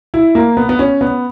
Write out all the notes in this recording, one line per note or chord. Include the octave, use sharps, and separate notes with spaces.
E4
A#3
B3
B3
C#4
B3